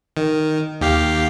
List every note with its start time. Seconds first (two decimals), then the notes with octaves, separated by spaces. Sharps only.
0.17 D#3
0.81 D#2 G4 F5